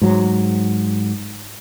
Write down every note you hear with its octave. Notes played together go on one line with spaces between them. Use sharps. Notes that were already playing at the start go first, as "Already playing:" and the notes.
G#2 F#3